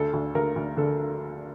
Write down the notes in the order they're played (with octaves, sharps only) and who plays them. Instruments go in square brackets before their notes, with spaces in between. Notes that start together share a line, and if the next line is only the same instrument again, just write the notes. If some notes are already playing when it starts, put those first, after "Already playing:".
Already playing: [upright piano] D2 A4
D2
D2 A#4
D2
D3 A4